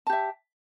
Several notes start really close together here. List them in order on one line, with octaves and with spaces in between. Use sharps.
A5 G4 E5